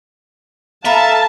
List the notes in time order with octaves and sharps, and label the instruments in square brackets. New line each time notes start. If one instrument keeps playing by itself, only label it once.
[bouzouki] A4 B4 A#5 [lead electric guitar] E5 [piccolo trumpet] F5 [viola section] A5